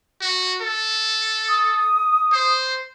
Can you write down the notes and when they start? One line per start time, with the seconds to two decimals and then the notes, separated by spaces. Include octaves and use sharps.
0.21 F#4
0.61 A4
1.49 D#6
2.33 C5